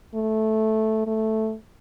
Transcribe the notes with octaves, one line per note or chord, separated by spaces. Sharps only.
A3
A3